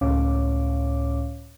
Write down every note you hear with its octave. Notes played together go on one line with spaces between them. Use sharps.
C#2 A2 C#4 C#5 F5 D6